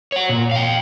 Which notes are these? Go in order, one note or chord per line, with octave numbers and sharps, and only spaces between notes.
C#5 F#5
A#2
F5 G5